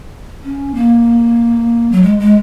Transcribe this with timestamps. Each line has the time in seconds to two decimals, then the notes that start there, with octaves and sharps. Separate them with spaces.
0.43 C#4
0.75 A#3
1.92 F#3
2.03 G#3
2.19 G#3